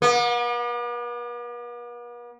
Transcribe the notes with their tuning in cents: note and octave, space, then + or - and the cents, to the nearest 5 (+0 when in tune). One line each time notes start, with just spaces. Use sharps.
B3 -45